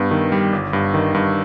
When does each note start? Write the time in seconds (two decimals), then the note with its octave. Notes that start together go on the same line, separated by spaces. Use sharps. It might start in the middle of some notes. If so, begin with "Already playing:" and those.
Already playing: G2 B3
0.11 D#3
0.32 G3
0.53 G1
0.73 G2
0.94 D#3
1.14 G2